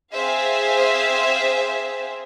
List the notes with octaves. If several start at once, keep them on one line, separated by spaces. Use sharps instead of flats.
C4 G#4 C5 E5 F5